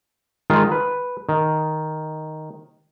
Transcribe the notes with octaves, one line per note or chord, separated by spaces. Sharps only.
D#3 G#3 F4
B4
D#3